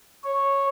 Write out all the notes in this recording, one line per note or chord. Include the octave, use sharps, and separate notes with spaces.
C#5